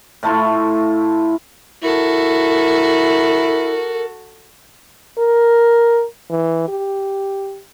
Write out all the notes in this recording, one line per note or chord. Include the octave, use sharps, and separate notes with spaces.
A2 A3 E4 F4
E4 F#4 A4 A#4
A#4
E3
G4